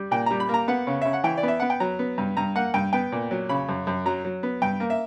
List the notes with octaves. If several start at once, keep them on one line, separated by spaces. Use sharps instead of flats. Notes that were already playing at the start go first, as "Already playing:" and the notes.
Already playing: G3
A#2 G5
G3 A#5
B5
A#3 A#5
B3 F#5
C#3
C#3 E5
F#5
E3 G5
D5
B3 E5
B3 F#5
G5
F#3 A#5
B3
G2
G2 A#5
A#3 F#5
G2 G5
B3 G5
A#2
F#3
C#3 B5
F#2
F#2
F#3 A#5
F#3
B3
G2 G5
A#3
E5